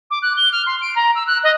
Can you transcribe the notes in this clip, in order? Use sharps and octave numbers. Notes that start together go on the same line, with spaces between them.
D6
F#6
G7
F6
C6
D7
A#5
E6
F#6
D#5